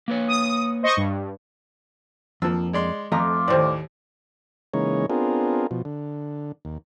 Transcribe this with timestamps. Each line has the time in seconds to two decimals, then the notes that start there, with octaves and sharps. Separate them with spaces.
0.08 A#3 B4 C#5
0.28 D#6
0.83 C5 D#5 C#6
0.97 G2
2.42 F2 F3 A#3 D4 E6
2.73 G#3 D5 C6
3.12 F2 A3 F4 D#5 A#5 D6
3.48 D#2 A2 C4 D5
4.74 C#3 E3 G#3 A#3 D#4 C#5
5.10 B3 C4 D4 F4 G#4 A#4
5.71 B2 F3
5.85 D3
6.65 D#2